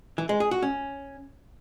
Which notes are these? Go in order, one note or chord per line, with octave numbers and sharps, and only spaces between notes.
E3
G#3
G#4
F#4
C#4